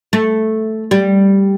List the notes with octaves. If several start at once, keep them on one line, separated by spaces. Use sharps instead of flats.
A3
G3